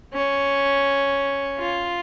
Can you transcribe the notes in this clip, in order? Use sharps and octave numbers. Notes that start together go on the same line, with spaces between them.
C#4
F4